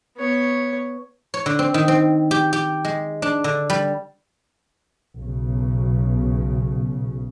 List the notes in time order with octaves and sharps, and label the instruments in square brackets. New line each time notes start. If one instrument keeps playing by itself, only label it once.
[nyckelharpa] B3 C#5
[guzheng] C#5
D3
C4
D#3
C4
G4
G4
G#3
D4
D3
G3
[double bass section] B1 C#3